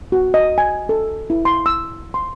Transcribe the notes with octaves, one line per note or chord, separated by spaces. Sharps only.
F#4
D#5
G#5
A4
E4
C6
E6
C6